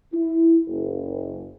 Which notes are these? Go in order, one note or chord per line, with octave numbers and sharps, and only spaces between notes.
E4
F#1